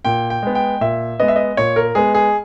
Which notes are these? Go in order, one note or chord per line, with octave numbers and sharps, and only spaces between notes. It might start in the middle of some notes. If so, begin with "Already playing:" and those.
A#2 G5
G5
G#3 B3
G5
A#2 E5
G#3 B3 D#5
E5
D#5
A#2 C#5
A#4
G#3 B3 G#4
G#4